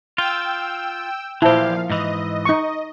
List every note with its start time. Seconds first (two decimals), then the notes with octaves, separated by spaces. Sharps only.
0.18 F4 G5 E6
1.42 A#2 E3 F3 E4 G4 C5 F5 A5
1.90 G#2 E3 D#5
2.45 D#4 C#6